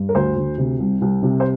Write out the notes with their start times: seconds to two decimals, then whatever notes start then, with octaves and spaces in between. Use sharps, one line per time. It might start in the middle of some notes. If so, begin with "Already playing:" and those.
Already playing: G2
0.09 A#4
0.15 D2 C5
0.36 D2
0.58 C3
0.80 C2
1.01 C2
1.23 C3
1.40 C5